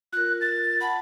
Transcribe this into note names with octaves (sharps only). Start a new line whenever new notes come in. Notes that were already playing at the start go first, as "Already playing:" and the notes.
F4 A#4 F#6
A6
F#5 A5 B5